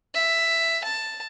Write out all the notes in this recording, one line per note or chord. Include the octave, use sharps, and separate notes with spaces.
E5
A5